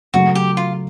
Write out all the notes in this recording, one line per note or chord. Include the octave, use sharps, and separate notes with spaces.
C#3 F#3 A3 F#4
G4
F4